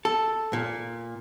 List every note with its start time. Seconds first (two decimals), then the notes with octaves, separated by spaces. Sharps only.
0.05 A4
0.53 A#2